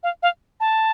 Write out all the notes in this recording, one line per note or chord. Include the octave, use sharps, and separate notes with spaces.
F5
F5
A5